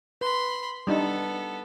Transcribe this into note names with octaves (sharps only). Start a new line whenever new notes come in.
B4 B5 C6
G3 B3 D4 D#4 A4